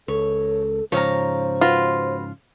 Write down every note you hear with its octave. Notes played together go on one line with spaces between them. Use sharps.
C#2 A4 C#5
G#2 C#3 F3 C5 C#5 F5 A#5
F4 F#4 B4